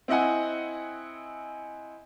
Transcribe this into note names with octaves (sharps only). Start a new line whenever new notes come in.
C4 E4 D#5 F#5 G#5